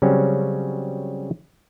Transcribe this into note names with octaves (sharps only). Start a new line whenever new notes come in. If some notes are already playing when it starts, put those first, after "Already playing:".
C#3 F#3 G3 C4 C#4